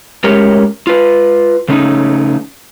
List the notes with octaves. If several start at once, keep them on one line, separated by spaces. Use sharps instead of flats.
A2 G#3 C#4 G4 A#4
F4 B4
C#3 A3 C#4 D#4